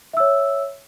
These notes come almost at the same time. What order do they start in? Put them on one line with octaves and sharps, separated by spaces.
E5 E6 C#5